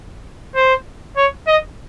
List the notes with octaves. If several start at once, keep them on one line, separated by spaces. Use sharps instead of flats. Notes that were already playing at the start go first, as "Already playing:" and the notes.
C5
C#5
D#5